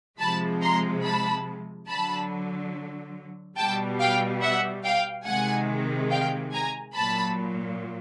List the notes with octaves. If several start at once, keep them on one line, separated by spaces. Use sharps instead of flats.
C3 F3 G#3 A5 B5
A#5 C6
A5 B5
D3 F#3 A5 B5
B2 G3 G5 A5
F5 G5
E5 F#5
F5 G5
C3 D#3 G#3 F#5 G#5
F5 G5
G#5 A#5
A#2 F#3 A5 B5